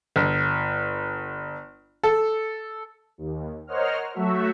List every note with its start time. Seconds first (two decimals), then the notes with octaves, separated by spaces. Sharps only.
0.16 G1
2.03 A4
3.18 D#2
3.67 A#4 C5 C#5 D#5 F#5 F6
4.13 F#3 A3 F#4 E5